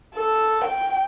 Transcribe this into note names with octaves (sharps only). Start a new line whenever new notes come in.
A4
G5